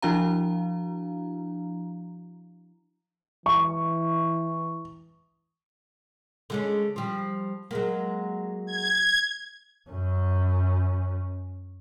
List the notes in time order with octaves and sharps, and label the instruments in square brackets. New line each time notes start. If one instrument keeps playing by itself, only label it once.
[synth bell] F3 D4 E4 F#4 F5 A#5
[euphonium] E3 [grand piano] C#6
[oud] D3 G#3 C#4
F3 G3
F#3 G#3 A#3
[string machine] G#6
[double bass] F#2 C#4